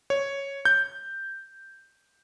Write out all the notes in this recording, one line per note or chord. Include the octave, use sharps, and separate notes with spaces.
C#5
G6